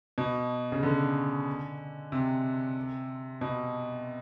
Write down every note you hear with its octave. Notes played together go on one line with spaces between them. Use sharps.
B2
C#3
D3
C3
B2